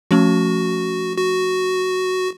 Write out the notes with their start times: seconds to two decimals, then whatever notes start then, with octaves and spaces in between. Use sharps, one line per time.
0.11 F3 A3 C#4 F#4
1.17 F#4